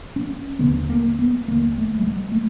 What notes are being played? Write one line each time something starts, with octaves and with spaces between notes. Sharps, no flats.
C#4
D#2 D3 B3
A#3
B3
D#2 D3 A#3
A3
G3
G#3
A3